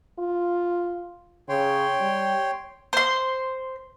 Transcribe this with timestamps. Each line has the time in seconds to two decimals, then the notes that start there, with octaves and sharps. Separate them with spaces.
0.19 F4
1.49 C#3 C#5 G5 C6
2.00 G3
2.93 C5 C6